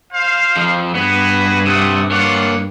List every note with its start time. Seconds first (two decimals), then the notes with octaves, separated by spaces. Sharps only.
0.13 C5 F5
0.56 F2 F3
0.95 G2 B3 F#4 G#4 B4
1.66 C3 A3 F#5 D#6
2.11 A#3 D4 F4 C#5 F#5